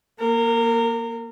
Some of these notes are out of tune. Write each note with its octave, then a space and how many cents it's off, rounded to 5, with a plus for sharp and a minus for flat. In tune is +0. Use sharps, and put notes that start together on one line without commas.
A#3 +15 A#4 -25